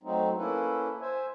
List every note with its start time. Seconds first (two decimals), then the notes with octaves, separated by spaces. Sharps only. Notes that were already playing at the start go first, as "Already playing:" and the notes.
0.03 F#3 A3 C4 D#4
0.37 A#3 C#4 E4 A4 B4
1.01 C5 E5 G#5